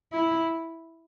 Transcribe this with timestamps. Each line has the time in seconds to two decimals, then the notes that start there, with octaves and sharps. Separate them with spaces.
0.13 E4